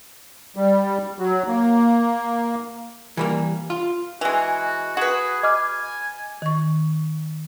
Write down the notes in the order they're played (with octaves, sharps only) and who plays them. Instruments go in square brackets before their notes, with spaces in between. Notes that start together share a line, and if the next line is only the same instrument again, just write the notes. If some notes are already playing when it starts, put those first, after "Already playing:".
[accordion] G3
F#3
A#3
[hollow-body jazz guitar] E3 G3 A#3
F4
[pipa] E3 G#3 [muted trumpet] F#4
[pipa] F#4 B4 [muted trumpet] G#4
[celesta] D#5 D6 F6 [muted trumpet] G#5
[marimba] D#3 C#6